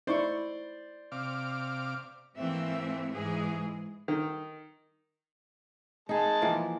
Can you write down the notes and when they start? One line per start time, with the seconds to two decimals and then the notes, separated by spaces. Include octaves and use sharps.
0.07 D#4 E4 C5 D5 C#6
1.12 C3 F5 D6
2.38 G#2 E3 A3 A#3 C4 E5
3.14 G#2 E3 G#3 G#4
4.08 D#3
6.09 G#3 D#4 G#4 A5
6.42 E3 F3 A#3